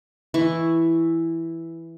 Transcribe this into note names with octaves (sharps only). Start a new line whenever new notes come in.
E3 E4 C#6